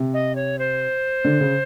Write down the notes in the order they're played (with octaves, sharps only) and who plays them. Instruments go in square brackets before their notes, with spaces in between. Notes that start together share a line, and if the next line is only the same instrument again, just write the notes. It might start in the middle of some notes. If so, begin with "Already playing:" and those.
Already playing: [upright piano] C3
[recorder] D#5
C#5
C5
[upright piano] D3
C#3